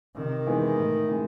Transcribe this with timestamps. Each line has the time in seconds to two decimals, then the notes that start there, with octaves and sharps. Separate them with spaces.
0.16 C3 D#3
0.47 E3 G#3 B3 D#4
0.77 A2
1.08 E3 G#3